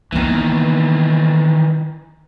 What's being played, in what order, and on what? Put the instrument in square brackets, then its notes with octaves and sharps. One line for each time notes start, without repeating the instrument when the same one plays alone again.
[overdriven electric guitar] D#3 E3 [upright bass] A#3 B3